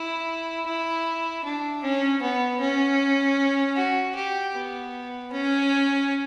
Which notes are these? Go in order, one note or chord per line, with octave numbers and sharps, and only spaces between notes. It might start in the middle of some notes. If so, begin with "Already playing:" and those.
Already playing: E4
E4
D4
C#4
B3
C#4
F#4
G4
B3
C#4